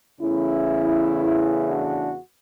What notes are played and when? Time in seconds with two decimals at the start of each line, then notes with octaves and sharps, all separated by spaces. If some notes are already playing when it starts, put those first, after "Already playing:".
0.20 E2 C#3 E3 A3 C#4 E4
1.68 D4 F#4